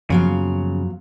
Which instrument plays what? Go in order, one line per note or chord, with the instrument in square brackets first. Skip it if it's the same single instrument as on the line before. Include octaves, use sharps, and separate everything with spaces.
[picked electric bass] F#2 A#3 B3 [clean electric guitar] C#3 [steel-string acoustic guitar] F3 F#3 F5